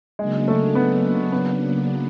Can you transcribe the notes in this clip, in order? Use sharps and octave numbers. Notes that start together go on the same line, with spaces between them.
C#3 F#3 G#3 A#3 D4
A3
B3
B3